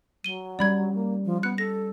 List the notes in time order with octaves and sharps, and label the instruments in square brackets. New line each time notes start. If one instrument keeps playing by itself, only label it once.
[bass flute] F#3 [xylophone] D#7 G7
[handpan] G3 C#4 [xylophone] D5 B5 G#6
[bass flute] A#3
F3
[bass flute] B3 [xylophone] F#6 C#7
[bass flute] A4 [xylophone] A#6